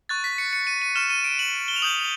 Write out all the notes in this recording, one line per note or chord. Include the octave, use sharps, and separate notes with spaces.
C#6 F#6 A6
B6
C#7
C#7
D#7
D#7
C#6 F6 E7
D#7
D7
F#7
G7
F7
D#6 G6 F#7